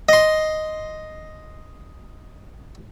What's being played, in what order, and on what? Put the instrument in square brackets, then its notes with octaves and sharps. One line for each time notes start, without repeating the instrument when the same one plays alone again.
[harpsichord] D#5 C6